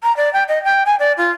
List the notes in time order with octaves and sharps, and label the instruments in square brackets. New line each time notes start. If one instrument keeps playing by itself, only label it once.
[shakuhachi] A#5
D5
G5
D#5
G5
G#5
D5
F4